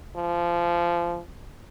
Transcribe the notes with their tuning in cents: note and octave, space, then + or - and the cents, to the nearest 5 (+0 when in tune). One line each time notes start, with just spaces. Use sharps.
F3 -20